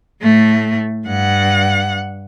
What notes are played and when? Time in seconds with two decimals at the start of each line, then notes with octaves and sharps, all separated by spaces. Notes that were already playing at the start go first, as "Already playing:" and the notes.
0.22 A2 A3
1.07 G2 F#5